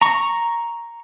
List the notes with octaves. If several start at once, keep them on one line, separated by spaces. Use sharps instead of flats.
A#5 C#6